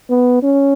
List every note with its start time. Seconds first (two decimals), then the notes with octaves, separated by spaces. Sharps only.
0.10 B3
0.43 C#4